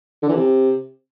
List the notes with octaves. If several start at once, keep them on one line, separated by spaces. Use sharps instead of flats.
D3
E3
C3